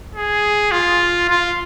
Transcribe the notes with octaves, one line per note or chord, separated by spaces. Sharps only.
G#4
F4
F4